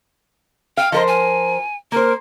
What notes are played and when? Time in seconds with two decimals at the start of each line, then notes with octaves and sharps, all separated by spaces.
0.77 F5 G5
0.92 F3 A#4 C5 D#5
1.07 G#5
1.92 A#3 A#4 C5